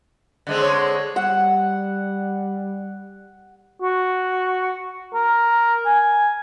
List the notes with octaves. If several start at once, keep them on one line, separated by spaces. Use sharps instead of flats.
D3 G#3 C4
C#5
G3 F#5 E6
F#4
A#4
G#5